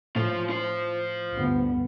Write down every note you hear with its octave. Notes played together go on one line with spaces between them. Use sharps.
A2 F4 C5
F4 C5
D2 G2 B3